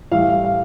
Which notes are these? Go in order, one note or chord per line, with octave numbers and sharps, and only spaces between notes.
A2 E3 G3 F5
F5